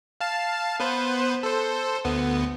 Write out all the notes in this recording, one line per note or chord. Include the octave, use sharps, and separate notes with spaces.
F5 A5
B3 B4 C5
A4 C5
D2 B3